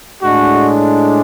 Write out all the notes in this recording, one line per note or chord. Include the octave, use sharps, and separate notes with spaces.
A2 G#3 D4 F#4